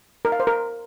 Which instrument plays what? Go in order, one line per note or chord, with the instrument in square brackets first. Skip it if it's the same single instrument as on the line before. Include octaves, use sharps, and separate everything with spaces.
[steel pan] A#4
F5
C5
A#4